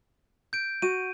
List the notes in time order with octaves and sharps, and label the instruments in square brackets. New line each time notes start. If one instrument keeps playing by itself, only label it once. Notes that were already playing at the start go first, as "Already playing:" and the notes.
[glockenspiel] G6 D7
[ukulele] F#4 [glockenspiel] D#7